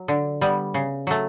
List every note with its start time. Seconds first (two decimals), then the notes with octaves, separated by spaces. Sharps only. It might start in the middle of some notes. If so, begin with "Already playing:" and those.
Already playing: F#3
0.08 D3
0.41 G3 B3
0.74 C#3
1.07 F#3 A3